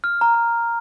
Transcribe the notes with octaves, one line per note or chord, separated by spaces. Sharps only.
F6
A#5
A#5